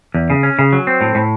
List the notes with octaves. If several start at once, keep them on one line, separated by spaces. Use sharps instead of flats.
E2
C#3
C#4
C#3
F#3
C4
A2
A2